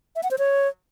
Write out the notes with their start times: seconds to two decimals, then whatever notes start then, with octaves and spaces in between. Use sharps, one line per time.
0.16 E5
0.23 F#5
0.31 C5
0.38 C#5